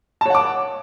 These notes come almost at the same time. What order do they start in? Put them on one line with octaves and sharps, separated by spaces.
A5 C#5 F#5 D6